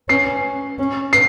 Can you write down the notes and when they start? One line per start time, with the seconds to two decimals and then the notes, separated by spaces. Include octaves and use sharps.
0.09 C#4 C7
0.79 C#4
1.13 C7